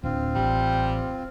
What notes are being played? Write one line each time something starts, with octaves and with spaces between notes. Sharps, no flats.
D1 C4 D4 F4
A1 G3